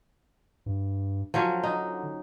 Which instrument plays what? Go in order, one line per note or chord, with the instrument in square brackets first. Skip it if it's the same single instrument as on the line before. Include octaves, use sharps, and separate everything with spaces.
[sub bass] G2
[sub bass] D3 [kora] F3 F#3 C#4
[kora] D#4